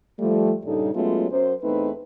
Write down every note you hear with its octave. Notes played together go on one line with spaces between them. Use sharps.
F3 G3 A3
G2 A#2 C#3 G3 D#4 A4
F#3 G#3 A3 B3 C#4 F4
F#2 C5
E2 A3 C4 D#4 B4